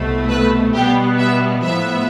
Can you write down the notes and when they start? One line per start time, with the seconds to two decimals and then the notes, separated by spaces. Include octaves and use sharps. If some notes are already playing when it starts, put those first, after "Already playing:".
Already playing: C2 B2 A3
0.30 B4
0.74 B2 G3 B3 G4
1.19 E5
1.63 A2 F3 B3 E5